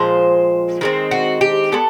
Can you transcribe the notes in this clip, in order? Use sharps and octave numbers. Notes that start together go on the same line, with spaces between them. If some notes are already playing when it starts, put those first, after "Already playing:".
Already playing: A#2 F3 G#3 C5
D#3 G#3 C4
F#4
G4
G#3 B3 A4